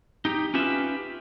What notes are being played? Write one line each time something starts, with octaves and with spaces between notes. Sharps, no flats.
D#4 G4
C#4 F4 G4 B4 E5